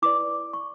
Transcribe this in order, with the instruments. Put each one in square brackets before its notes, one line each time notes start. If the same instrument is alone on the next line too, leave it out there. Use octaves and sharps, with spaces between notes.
[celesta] E4 B4 D5 D6
C#6